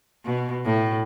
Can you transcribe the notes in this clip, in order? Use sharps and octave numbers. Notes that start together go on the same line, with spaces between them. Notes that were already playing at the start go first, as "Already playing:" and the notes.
B2
A2